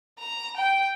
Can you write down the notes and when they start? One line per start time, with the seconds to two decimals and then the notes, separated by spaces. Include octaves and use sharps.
0.19 A#5
0.57 G5